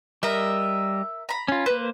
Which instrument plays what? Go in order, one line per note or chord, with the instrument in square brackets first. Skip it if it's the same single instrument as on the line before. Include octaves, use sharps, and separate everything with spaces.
[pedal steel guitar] G3 D#5 [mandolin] A#4 E5
[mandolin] A#5 B5
[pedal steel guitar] C#4 F4
[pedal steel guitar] A#3 C5 [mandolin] B4